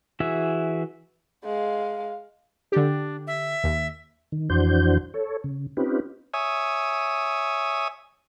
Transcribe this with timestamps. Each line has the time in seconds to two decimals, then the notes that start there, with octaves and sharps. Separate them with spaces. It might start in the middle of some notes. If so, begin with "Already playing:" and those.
0.20 E3 F#4 G#4 E5
1.45 G#3 F5
2.72 D3 D4 G4
3.27 E5
3.64 D#2
4.32 D#3
4.50 F2 E3 D4 F#4 C5 G6
5.14 A4 C#5
5.44 C#3
5.77 C4 C#4 D#4 F4 G4 B4
6.34 C#5 E5 G#5 D#6